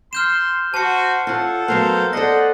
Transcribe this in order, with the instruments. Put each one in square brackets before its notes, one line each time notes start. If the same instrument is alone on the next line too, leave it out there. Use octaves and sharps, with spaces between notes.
[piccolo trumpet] C6 [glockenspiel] F6 G6 E7
[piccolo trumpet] F#4 [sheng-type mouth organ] C5 [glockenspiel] A5 C#7
[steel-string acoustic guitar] F4 C#5 [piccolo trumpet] A4 [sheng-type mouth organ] F#5
[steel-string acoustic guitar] F#3 A3 B3 [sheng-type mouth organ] A#4 C5 F5
[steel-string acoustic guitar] A4 D5 [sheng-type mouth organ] C5 D#5 [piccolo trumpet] F#5 [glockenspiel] A#6